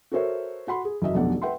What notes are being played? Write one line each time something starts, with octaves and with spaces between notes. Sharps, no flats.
F#4 A4 A#4 C5 C#5 E5
F#4 F#5 B5 C6
G#4
F#1 F#3 D#5 E5
F1 B1 B2 D3 D5 F#5
B4 E5 F#5 G5 C6